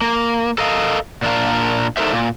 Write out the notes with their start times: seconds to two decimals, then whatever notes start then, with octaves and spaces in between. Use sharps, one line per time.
0.01 A#3
0.58 A4 A#4 D#5 F5
1.22 A#2 D4 A#4 F5
1.97 D4 D#4 A4 A#4 C5 E5
2.12 A#2